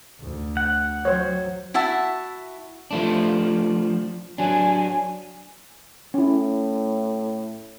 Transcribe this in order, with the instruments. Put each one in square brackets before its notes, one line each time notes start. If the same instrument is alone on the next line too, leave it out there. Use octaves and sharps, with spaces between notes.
[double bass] D2
[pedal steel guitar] F#5
[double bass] F#3 [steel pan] C5 C#5
[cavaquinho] E4 F#4 E5 A5
[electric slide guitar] F3 A3 D4
[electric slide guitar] F#3 D4 [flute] G#5
[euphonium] A2 [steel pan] C#4 E4